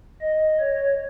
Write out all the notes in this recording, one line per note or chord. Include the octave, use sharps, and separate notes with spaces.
D#5
C#5